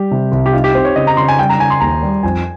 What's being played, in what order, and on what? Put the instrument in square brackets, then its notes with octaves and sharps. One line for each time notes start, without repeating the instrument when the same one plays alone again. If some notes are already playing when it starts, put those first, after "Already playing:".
Already playing: [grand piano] G3 [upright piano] G4
[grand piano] C3
C2
[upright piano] G4
[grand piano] D#4 [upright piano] F4
[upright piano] G4
[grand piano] C4 [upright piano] C5
[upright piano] C#5
[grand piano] C#3 [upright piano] D#5
[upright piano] A#5
[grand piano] C#3 [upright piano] C6
[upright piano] G#5
[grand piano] G3 [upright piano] G5
[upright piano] A#5
[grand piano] C#3 [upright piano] G#5
[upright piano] C6
[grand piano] D#2 [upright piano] A#5
[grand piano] G3
[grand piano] F2 [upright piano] G#5